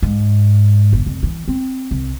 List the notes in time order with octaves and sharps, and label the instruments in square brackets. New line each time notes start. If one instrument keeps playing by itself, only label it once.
[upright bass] G#2
G1
F1
E3
C4
C2